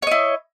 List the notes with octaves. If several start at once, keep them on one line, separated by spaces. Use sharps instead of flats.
E4 C#5 D#5